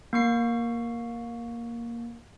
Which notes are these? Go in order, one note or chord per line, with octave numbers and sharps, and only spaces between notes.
A#3 C#6 C7